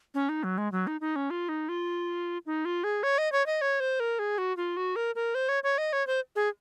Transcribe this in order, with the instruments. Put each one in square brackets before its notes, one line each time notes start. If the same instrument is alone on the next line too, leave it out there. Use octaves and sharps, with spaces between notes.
[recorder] C#4
D#4
F#3
G#3
F#3
D#4
D#4
C#4
F4
D#4
F4
D#4
F4
G#4
C#5
D#5
C#5
D#5
C#5
C5
A#4
G#4
F#4
F4
F#4
A#4
A#4
C5
C#5
C#5
D#5
C#5
C5
G#4